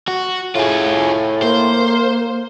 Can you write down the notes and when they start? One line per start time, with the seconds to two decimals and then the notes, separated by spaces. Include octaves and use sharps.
0.08 F#4
0.55 A2 F4 G#4
1.42 A#3 C5